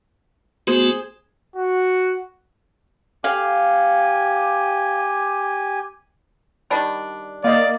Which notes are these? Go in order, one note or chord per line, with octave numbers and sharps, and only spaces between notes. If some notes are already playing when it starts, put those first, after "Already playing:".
A3 B3 F#4 G#4 C5
F#4
G4 F5 G#5
D#3 G3 D4
A#3 D5 D#5 F5